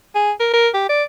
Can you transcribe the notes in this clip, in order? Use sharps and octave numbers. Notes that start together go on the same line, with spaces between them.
G#4
A#4
A#4
G4
D5